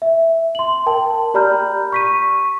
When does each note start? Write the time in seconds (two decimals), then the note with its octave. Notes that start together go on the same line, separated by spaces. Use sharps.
0.02 E5
0.55 C6 F#7
0.86 A#4 G5 A5
1.34 G4 D5 A#5 B5 F6 G6
1.92 C#6 B6 D#7